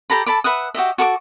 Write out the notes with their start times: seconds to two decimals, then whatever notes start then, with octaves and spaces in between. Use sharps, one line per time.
0.10 G4 A4 A#5 B5
0.26 A4 A5 B5 D6
0.44 B4 E5 F#5 D#6
0.75 F#4 G4 D#5 E5
0.98 F#4 A4 C#6 D6